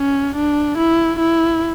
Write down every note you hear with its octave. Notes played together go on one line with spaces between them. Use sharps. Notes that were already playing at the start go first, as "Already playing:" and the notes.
Already playing: C#4
D4
E4
E4